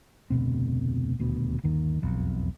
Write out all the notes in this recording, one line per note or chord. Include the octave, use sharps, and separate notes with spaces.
F1 D2 B2 C4
D#1 D2 B2
G1 D#2 D#3
E1 B1 F2